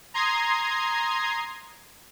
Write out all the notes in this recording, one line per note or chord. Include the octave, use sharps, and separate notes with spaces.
A#5 C6 D#6 G#6 C7